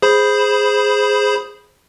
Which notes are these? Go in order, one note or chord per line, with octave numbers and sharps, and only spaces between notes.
G#4 C5 B5